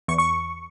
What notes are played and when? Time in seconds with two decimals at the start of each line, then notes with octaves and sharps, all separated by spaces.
0.08 E2 C#6
0.18 C#6